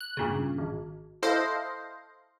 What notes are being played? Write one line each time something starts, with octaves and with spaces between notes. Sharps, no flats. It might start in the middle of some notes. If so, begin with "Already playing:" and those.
F#6
G2 A#2 C#3
G#1
E4 A4 C5 D#5 F5